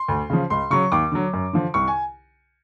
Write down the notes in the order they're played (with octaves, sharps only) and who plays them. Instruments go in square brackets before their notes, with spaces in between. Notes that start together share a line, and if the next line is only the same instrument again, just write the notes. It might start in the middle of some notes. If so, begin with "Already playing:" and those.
Already playing: [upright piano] C6
D2
C#3 F3
C#2 C6
C#3 F#3 C#6
D#2 D6
D3 F#3
F#2
D3 F3
C2 C#6
G#5